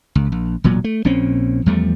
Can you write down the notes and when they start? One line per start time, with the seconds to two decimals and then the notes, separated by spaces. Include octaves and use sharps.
0.15 C#2
0.32 A#1
0.64 E1 A#2 F#3
0.84 A3
1.05 A#1 A#2 C4 C#4
1.66 E2 F3 G3 A3